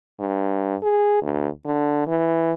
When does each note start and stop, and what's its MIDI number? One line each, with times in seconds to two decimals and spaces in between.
0.20 0.75 43
0.82 1.20 68
1.22 1.48 38
1.65 2.06 50
2.07 2.52 52